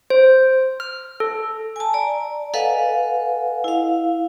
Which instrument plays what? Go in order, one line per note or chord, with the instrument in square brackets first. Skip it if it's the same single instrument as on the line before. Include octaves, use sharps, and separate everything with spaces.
[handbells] C5
F6
A4
[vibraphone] G#5 A5
D5 A#5
A4 B4 D#5 F5 F#5 G#5
E4 F5